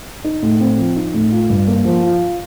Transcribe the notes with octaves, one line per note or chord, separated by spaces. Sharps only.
D#4
A2
C4
F3
D#4
A2
F4
G2
A#3
F3
F4